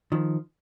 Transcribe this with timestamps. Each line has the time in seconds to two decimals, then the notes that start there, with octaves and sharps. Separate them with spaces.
0.12 D#3 F3